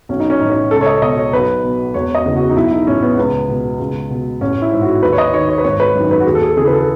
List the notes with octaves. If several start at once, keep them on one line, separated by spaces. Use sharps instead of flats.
B1 C#4
D#4
C#4
A2 E3 D#4
C#4
C#2 A4
C#5
D#5
B2 D#5
C#5
B1 B4
B2
E1 C#5
D#5
E2 C#3
F#4
D#4
B1 E4
D#4
A2 E3 C#4
B3
C#2 B3
B2
C#2
B2
A1 C#4
E4
G#2 E3
F#4
D#2 B4
C#5
D#5
D#3 C#5
C#5
B4
G#1 C#5
B4
F#2 D#3
B4
F#4
D#2 G#4
A4
G#4
C#3 E3 G#4
B4
A4